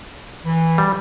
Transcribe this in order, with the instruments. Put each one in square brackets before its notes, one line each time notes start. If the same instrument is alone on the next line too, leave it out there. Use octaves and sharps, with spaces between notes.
[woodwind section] E3
[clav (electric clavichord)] G3